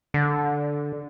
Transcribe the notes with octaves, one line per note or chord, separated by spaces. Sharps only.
D3